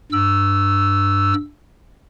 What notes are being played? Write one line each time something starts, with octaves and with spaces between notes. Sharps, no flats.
G2 E6